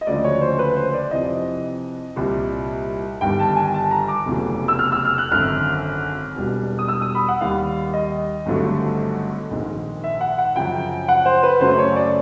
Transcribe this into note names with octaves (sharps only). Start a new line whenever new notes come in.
D#5
D2 C#3 F3 G#3 D5
C#5
C5
B4
C5
D5
F2 C3 E3 D#5
C2 A#2 G3
G1 G2 D#3 G3 G5
A5
G#5
A5
A#5
D6
F1 E2 C#3 F#3 A3
E6
F6
E6
F6
F#6
G#1 F#2 D3 F6
E1 E2 B2 G3
D#6
E6
D#6
B5
F#5
D#2 D#3 G3 F5
D#5
G#1 G2 D3 F#3 A3
A#1 G#2 D#3 G#3
E5
F#5
F#5
F#2 C#3 F3 G5
F#5
C5
B4
F#2 C#3 F#3 A3 C5
C#5
D5